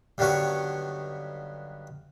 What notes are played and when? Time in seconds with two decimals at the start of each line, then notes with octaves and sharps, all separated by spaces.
0.18 G2 D3 D#3 F#3 B3 C#6